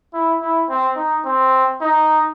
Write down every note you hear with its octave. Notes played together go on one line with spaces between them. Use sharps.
E4
E4
C4
D#4
C4
D#4